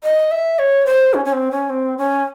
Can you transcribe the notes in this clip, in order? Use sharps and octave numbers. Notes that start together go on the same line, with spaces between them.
D#5
E5
C#5
C5
C#4
C#4
C4
C#4
C4
C#4